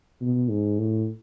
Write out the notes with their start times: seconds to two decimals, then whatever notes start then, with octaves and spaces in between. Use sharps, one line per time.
0.21 B2
0.50 G#2
0.79 A2